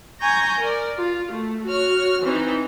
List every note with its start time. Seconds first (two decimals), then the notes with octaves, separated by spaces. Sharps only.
0.21 G#5 A#5 C#6 G6 A#6
0.60 A#4 D5
0.98 F4
1.32 A3
1.67 F#4 C#5 F6
2.23 E3 C4 D#4